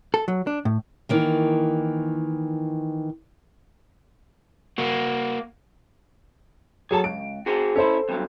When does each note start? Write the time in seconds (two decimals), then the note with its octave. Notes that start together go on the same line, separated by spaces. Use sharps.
0.14 A4
0.28 F#3
0.47 D4
0.65 A2
1.09 D#3 E3 A#3
4.78 A#3 F#4
6.91 F#3 G#4 A4 A5
7.04 C#2 D7
7.46 F#4 G#4 C5
7.76 C#4 E4 A4 C5
8.09 E2 G2 F#3